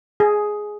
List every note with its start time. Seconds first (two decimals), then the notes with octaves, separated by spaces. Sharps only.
0.20 G#4